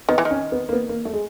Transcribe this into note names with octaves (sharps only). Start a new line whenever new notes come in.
D#3 B3
E3
D#3
C#4
B3
A#3
B3
A#3
A3
G#3